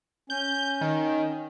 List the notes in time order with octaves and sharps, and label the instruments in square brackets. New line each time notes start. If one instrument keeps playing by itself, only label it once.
[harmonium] C#4 [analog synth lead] G6
[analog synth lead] D#3